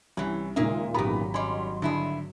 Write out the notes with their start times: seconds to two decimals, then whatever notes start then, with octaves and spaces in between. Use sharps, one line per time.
0.17 C2 E3 C#4
0.56 D#2 A#2 C#3 G#3 A#3 D#4 G#4 E5
0.94 G#1 E2 D#3 F#3 B3 G4 A#5 B5
1.34 G3 C#4 D#5 C6
1.82 G2 D3 E4 G#4